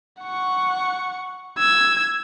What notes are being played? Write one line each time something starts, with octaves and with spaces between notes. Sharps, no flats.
F#5 C#6
E6 G#6